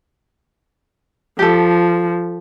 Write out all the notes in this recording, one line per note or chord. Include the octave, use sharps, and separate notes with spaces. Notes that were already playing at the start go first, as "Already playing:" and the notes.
F3 G4 A4